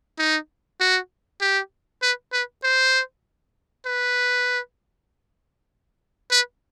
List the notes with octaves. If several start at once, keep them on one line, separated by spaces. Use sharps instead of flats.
D#4
F#4
G4
B4
B4
C5
B4
B4